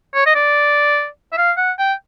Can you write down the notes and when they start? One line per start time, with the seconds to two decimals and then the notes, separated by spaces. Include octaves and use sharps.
0.15 C#5
0.26 D#5
0.35 D5
1.33 E5
1.38 F5
1.57 F#5
1.79 G5